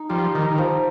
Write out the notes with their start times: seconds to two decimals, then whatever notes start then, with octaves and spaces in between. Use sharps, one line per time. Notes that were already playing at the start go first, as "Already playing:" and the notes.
Already playing: D#4
0.09 F3 G3
0.35 D#3 D#4
0.50 D#3
0.58 F3